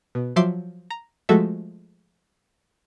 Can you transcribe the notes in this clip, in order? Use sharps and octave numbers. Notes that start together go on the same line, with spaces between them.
B2
F3 F#3 E5 C6 D6 C7
A#5
F3 G#3 A3 F#4 A4 E5